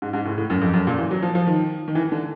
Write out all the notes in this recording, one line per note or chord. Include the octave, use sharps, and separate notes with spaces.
G#2
G#2
A2
A2
F#2
F2
F#2
A#2
E3
F#3
F3
F3
D#3
D#3
E3
D3